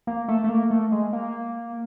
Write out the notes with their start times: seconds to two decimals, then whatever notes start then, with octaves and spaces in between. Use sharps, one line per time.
0.07 A#3
0.28 A3
0.44 A3
0.49 A#3
0.71 A3
0.92 G#3
1.13 A#3